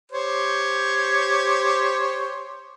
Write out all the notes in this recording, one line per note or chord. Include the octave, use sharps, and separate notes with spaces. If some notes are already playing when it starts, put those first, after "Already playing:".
G4 C5 C#5